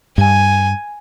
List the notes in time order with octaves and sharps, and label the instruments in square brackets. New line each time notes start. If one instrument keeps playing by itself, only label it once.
[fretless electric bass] G2 [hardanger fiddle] G#5